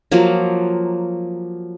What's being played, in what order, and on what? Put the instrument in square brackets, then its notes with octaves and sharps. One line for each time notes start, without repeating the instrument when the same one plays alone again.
[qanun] F3 F#3 A#3